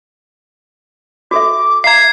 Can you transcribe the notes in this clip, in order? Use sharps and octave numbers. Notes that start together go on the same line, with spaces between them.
F#4 A4 E5 D6
E5 F5 A#5 G#6 C7